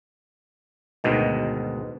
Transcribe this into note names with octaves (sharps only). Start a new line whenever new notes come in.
D2 G#2 B2 D#3